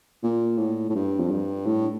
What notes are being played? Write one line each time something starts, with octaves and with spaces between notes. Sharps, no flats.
A#2
A2
A2
G2
F2
G2
A2